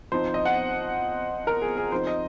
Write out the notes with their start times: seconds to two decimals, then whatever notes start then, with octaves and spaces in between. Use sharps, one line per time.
0.12 F3 C4 D#4 C5
0.34 D#5
0.45 F#5
1.47 A#4
1.62 G#4
1.77 G#4
1.92 F3 C4 D#4 C5
2.07 D#5